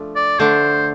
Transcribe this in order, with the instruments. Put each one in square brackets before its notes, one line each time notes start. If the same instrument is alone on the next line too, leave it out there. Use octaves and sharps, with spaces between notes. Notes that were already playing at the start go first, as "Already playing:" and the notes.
Already playing: [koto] F3 A3 D4
[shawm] D5
[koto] D3 A3 D4 [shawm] C5